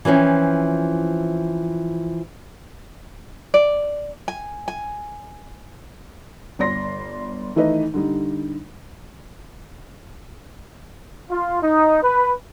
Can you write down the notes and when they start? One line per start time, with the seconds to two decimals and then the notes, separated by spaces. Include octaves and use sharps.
0.05 E3 F3 C4 C#4
3.54 D5
4.28 G#5
4.68 G#5
6.59 G1 D5 C6 A#6
7.55 D#3 E3 A3 D#4 B4 D#5
7.94 D3 G3 D#4
11.31 F4
11.63 D#4
12.03 B4